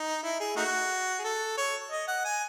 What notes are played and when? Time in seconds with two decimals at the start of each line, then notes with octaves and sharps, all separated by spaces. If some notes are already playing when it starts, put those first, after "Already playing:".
Already playing: D#4
0.23 E4
0.40 G#4
0.56 A3 D#4 F#4
1.19 G#4
1.24 A4
1.57 C#5
1.91 D#5
2.08 F#5
2.25 G#5